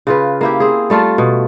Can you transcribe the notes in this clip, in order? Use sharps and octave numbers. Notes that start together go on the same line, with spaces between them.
C#3 F4 B4
A#3 E4 G4
C4 G#4
G3 A3 F4 A4
B2